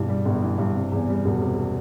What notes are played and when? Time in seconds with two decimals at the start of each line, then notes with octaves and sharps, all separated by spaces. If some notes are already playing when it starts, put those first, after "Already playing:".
Already playing: G2 B2 E3
0.09 G3
0.25 G1
0.42 E3
0.58 G2
0.75 C3
0.92 E2
1.09 G3
1.25 E1
1.41 C3